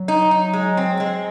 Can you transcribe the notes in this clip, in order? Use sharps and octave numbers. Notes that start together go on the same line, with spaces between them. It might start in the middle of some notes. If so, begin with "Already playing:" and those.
Already playing: F#3
D#4
D#4
G#3
C4
G#3